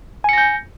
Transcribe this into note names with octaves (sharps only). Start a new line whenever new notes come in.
G#5 G6 A#6 C#7